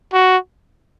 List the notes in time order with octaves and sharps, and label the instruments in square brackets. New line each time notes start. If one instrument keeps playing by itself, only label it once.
[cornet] F#4